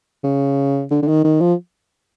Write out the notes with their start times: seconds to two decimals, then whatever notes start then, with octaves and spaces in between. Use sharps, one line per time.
0.24 C#3
0.91 D3
1.02 D3
1.08 D#3
1.24 D#3
1.41 F3